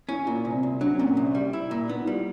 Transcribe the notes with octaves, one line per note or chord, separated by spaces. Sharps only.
C#4 E4
A#2 F4
C2
C4
C2
F#3 D4
C#4
C4
A#2 C#4
C2
G3
E4
A#2
B3 D#4
E4
G3 F4